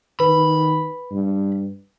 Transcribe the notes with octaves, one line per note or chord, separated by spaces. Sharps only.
D#3 B4 B5
G2